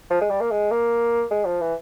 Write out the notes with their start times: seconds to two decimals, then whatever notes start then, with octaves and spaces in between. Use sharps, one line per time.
0.10 F3
0.21 G#3
0.30 G3
0.41 A#3
0.51 G#3
0.71 A#3
1.31 G#3
1.46 F3
1.61 E3